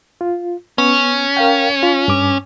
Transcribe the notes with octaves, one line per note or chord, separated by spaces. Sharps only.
F4
B3 C#4
A#4 F5 G5
F4
G2 D6